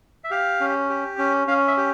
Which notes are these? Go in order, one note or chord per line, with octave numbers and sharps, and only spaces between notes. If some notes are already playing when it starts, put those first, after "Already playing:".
E5
G4 F5
C#4
G4
C#4
C#4 F5
E5
G4